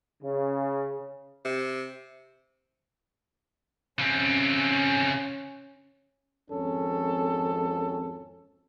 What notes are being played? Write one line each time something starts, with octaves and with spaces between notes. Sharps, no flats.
C#3
C3
C#3 C4 C#4
G#1 F2 C#4 A4